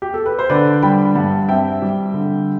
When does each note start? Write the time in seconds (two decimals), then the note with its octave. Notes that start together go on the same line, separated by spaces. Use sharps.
0.02 G4
0.14 A4
0.26 B4
0.39 C5
0.50 D3 B4 D5
0.82 G3 G5 B5
1.15 G2 F#5 A5
1.48 C4 E5 G5
1.82 G3
2.14 D3